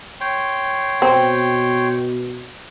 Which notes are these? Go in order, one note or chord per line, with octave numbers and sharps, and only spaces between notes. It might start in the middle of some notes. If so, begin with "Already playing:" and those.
C#5 G5 C6
B2 C4